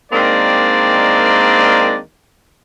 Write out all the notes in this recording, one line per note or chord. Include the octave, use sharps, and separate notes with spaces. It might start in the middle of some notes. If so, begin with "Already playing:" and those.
D#3 G#3 A#3 C4 D4 D5